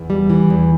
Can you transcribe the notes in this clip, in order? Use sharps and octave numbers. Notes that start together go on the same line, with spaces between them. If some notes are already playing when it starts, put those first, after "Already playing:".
Already playing: E2
G3
E3
E2